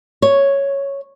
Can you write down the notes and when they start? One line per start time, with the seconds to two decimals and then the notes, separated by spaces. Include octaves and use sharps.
0.22 C#5